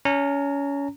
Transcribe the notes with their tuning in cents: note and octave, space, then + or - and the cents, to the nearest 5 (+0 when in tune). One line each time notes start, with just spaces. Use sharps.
C#4 +25 A#5 -25